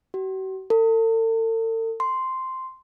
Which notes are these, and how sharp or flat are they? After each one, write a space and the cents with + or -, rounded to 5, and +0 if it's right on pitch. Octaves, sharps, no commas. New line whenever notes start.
F#4 +45
A4 +40
C6 -5